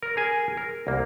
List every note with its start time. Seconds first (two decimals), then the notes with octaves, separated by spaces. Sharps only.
0.03 A#4
0.17 G#4 A#4 G#5
0.57 A#4
0.87 C2 A#3